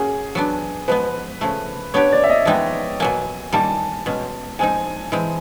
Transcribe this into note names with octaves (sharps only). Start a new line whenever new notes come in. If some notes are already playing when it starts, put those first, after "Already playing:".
Already playing: A#3 C#4 F#4 G#4
F#3 B3 D4
F3 G#3 B3 B4
C#3 F3 A3
B3 D4 G4 C#5
D5
E5
D#5
F3 G#3 B3 D#4 G5
B2 F#3 A#3 G#5
D#3 G3 A#3 A5
B2 G#3 C#4
F3 G#3 C4 D#4 G#5
E3 G#3 C4